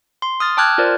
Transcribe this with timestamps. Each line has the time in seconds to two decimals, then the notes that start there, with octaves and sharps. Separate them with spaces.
0.22 C6
0.40 D#6 F6 A6
0.57 G5 A5 D6 F6 F#6 G#6
0.78 F4 A#4 C5 D5